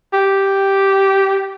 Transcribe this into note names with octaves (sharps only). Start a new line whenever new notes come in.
G4